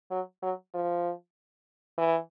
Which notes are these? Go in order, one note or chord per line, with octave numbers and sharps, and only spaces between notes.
F#3
F#3
F3
E3